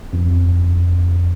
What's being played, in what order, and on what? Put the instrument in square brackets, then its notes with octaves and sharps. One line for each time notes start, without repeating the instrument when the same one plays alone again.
[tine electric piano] F2